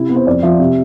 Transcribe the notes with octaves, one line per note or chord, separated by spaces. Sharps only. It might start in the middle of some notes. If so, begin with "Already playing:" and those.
Already playing: C3 E4
B3
C5
F2 D5
F3 E5
C3